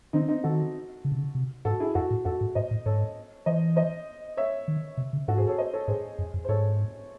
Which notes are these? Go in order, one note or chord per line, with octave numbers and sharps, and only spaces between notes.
D#3 C4 D#4
C4 D#4
D#3 F#4 A4
C#3
C3
C#3
C3
G#2 F#4 A4
E4 G#4
F#2 F#4 A4
A2
F#2 F#4 A4
G#2
G#2 C5 D#5
A2
G#2 A4 C#5
E3 C5 D#5
C5 D#5
C#5 E5
D#3
C3
C#3
G#2 F#4 A4
G#4 C5
A4 C#5
C5 D#5
A4 C#5
G#2 G#4 C5
F#2
F#2
C5
G#2 A4 C#5